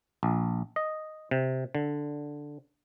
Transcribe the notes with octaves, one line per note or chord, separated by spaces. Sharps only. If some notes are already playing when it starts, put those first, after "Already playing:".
A#1
D#5
C3
D3